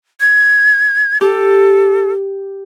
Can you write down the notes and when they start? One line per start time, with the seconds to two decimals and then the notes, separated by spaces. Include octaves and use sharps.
0.20 G#6
1.21 G4 A4